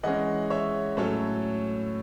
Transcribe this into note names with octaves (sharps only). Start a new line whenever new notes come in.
E3 G#3 C#4 D#5 F#5
C#5 E5
A2 F#3 C#4 A4 C#5